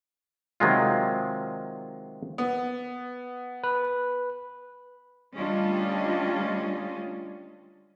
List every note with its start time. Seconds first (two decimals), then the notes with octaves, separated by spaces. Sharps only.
0.60 C3 D#3 F#3 G#3 F4
2.38 B3
3.64 B4
5.36 D2 G3 C#4 D4 F4 D#5